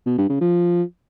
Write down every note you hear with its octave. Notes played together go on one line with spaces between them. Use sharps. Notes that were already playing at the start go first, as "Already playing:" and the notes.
B2
G2
C#3
F3